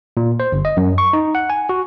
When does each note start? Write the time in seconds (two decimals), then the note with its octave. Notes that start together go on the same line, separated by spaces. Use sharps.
0.17 A#2
0.40 C5
0.52 G1
0.65 D#5
0.77 F#2
0.98 C#6
1.13 D#4
1.35 F#5
1.50 G#5
1.69 F#4